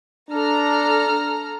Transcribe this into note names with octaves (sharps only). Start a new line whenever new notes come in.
D4 A4 A#5 F6